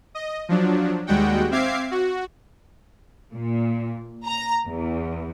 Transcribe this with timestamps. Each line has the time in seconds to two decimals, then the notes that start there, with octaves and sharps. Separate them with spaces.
0.15 D#5
0.49 F3 F#3 D4
1.07 D#2 G3 G#3 F#4 F#5 G5
1.51 C4 E5 F5 D6 G#6 C7
1.91 F#4
3.32 A#2
4.25 A#5
4.68 E2